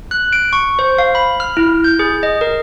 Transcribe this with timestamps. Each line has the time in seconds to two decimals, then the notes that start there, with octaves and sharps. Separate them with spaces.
0.11 F#6
0.33 D7
0.53 C#6
0.79 C5
0.98 F5
1.15 B5
1.40 F6
1.57 E4
1.84 G6
1.99 G#4
2.23 D#5
2.41 A#4